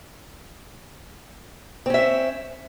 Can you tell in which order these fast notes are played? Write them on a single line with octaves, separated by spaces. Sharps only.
C4 C#4 E5